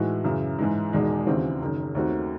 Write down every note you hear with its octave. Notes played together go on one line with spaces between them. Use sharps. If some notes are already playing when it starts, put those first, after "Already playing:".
Already playing: A2 E3 G#3 D#4 F#4
F#2 C#3 E3
G#2 E3 G#3
E1 E2 D#3 G#3 D#4
D#2 C#3 E3 C4 F#4
F#1 F#2 D#3
D#2 D#3 A3 C4 F#4